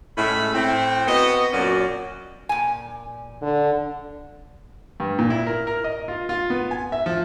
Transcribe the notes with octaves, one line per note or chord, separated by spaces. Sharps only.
A2 G#3 C#4 E5 B5
A2 C4
B3 C4 F#4 D#5
F#2 A#2 C#4 F#4 D5
A#2 G#5
D3
G2
A#2
E4
A#4
A#4
D#5
F4
F4
B3
G#5
E5
F3